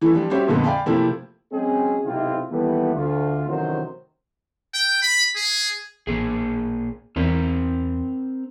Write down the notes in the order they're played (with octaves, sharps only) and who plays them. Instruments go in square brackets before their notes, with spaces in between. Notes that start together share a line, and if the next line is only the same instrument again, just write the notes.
[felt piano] E3 A3 E4
F3 G3 D4
G3 C#4 F#4 G4 C5 E5
F2 A#2 D3 F3 G#3 B3
D5 F5 G5 G#5 B5
C3 F3 A3 A#3 C4 E4
[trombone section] F#3 G#3 C4 C#4 G#4
B1 G#2 C3 C4 E4 F4
D#2 E3 G3 A3 B3
D2 F4
A1 C3 D#3 F#3 F#4 C5
[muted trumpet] G5
B5
G#4
[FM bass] A1 [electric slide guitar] A#2 A#3 G#4
[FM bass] E2 [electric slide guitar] C4 A#4 C5